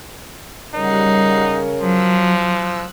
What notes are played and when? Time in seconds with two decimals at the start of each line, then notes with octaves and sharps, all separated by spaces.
0.75 C#3 G3 D#4 A#4 C#5 F#5 C7
1.81 F3 F#3 E6 F#6